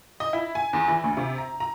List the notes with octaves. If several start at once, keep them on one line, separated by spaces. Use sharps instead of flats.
D#5
E4
G#5
E2
E3
D2
C3
A#5
A#5